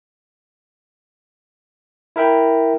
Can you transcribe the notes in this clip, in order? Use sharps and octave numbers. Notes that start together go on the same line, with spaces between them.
E4 A#4 E5 G5 B5